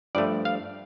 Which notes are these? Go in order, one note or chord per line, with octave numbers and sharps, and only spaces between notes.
G2 F3 A3 D5
F5